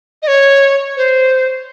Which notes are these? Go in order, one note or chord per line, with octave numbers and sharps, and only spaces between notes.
D#5
C#5
C5